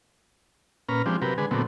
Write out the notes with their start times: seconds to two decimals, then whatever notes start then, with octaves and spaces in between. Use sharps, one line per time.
0.89 A#2 C#4 B4 A#5 F6
1.06 F3 G#3 C4 D4 G4
1.22 C3 F#3 G4 A#4 B4
1.38 D3 G#3 G#4 B4
1.51 A#2 D3 F#3 A3 B3 C4